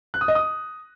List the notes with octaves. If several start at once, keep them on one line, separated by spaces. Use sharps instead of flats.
F#6
D#6
D#5
D#6